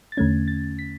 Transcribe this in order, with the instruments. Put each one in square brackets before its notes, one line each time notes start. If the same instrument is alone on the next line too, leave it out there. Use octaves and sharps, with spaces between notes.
[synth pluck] A6
E2 D3 A3 C#4 G#6
A6
B6